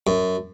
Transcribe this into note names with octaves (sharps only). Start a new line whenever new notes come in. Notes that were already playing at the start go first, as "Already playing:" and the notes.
F#2